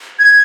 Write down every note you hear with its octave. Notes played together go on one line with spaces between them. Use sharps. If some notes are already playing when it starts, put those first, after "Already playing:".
G#6